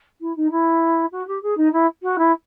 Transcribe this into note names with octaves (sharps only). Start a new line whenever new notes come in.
E4
D#4
E4
F#4
G4
G#4
D#4
E4
F#4
E4